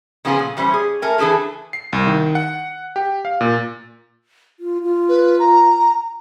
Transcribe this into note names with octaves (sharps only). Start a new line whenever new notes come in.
C#3 F3 B3 F4 F#4 G#4
A#2
E3 G3 C#4 C5
G#4
A3 A#4 G#5
E3 D4 G#4 A4 B4
C7
C2
D#3
F#5
G4
F5
A#2
F4
F4
B4
A#5